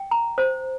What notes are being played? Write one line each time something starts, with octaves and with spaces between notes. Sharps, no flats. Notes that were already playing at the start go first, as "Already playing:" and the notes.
Already playing: G5
A#5
C5